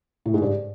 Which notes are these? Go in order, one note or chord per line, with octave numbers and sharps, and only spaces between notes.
A2
G#2
G2